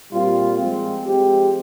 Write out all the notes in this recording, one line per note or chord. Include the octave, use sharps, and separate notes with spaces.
A#2 G3 C4 F4
F3 G#3 C4
F3 G#3 C4 G4